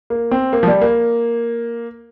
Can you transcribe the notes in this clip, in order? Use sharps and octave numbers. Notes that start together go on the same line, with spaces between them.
A#3
C4
A#3
F3
G3
A#3